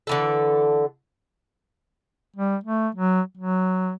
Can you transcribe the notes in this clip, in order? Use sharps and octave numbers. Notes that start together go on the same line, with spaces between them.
D3 E3 A4
G3
A3
F#3
F#3